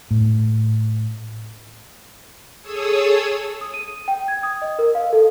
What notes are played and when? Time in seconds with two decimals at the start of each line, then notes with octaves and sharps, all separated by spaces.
0.11 A2
2.61 G#4 A4 C#5 D#6 E6
3.61 D#6
3.74 D#7
4.08 G5
4.28 G#6
4.43 D#6
4.62 D#5
4.79 A#4
4.95 F5
5.13 A4